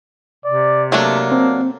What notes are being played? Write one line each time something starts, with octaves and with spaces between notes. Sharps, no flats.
C3 D5
F#3 A3 A#3 D4
C4